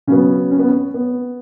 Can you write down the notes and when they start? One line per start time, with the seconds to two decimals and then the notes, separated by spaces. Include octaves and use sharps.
0.07 C#3 F#3 B3 C#4
0.51 C#4
0.59 B3
0.68 C#4
0.94 B3